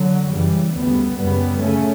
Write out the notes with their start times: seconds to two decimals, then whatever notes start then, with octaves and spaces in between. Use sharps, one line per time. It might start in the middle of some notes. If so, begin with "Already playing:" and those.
Already playing: D3 F#3
0.32 F#2 C#3 E3 G3
0.75 D2 C#3 G3 B3
1.19 F#2 C#3 G3 B3
1.62 C#3 A3 C#4